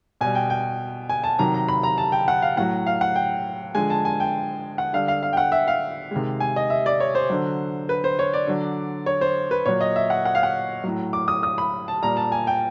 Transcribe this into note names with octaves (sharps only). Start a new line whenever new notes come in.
B2 G3 G#5
G5
G5
G#5
A5
C3 D#3 F#3 A#5
A#5
B5
A#5
A5
G5
F#5
F5
A2 F#3 F#5
F5
F#5
G5
D3 F3 G#3 G#5
A5
G#5
G5
F#5
D3 G3 F5
F5
F5
G5
F#5
E5
F5
C3 D#3 G#3
G#5
D#5
E5
D5
C#5
C5
D3 F#3
B4
C5
C#5
D5
D3 F#3
C#5
C5
B4
A#2 F#3 C#5
D#5
E5
F#5
F#5
F5
F#5
A2 F#3
D6
D#6
D#6
B5
A5
A#2 G3 A#5
A5
G#5
G5